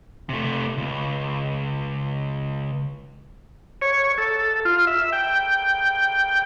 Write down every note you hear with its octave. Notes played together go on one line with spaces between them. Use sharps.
C3 A3
C#2
C#5
A4
F4
E5
G5